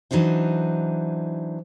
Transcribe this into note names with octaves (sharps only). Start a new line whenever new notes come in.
E3 F#3 D4 D#4 C5